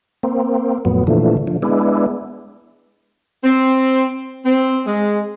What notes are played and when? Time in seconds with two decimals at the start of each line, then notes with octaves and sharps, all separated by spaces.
0.23 A#3 C4
0.85 F2 A2 F#3 B3
1.07 A#2 D3 E3 F3 A3
1.47 D3 F3
1.62 G#3 B3 D4 E4
3.44 C4
4.45 C4
4.87 G#3